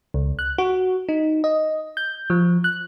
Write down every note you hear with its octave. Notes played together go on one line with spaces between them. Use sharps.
C#2
F#6
F#4
D#4
D#5
G6
F3
F#6